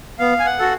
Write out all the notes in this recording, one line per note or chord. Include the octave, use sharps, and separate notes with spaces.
B3 F5
G#5
F#5
F#4 A4